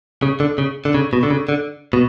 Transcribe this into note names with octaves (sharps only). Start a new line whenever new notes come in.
C#3
D3
C#3
D3
C#3
B2
D3
C#3
D3
B2